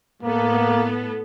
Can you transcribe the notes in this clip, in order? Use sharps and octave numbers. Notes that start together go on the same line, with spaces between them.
A2 A#3 B3 A4